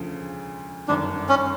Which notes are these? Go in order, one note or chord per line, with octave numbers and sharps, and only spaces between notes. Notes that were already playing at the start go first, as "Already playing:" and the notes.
Already playing: E1 D2 C#3 F3
G1 F#2 D#3 D4
C#4